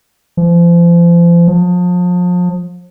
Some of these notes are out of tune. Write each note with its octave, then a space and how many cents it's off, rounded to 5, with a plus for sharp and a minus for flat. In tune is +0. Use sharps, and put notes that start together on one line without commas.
F3 -35
F3 +35